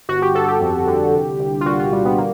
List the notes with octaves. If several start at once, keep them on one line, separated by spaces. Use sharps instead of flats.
G1 F#4
G4
G1 A4
G4
F2
D3
C2
C2
F4
A#2 F#4
F4
G3
B3
A#3